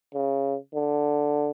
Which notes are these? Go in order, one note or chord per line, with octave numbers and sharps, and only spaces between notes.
C#3
D3